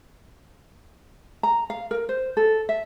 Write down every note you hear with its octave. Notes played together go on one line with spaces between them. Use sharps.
A#5
F5
A#4
C5
A4
E5